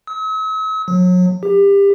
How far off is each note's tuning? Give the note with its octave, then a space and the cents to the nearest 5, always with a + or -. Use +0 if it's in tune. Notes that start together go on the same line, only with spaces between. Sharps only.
E6 -45
F#3 -35
G4 +25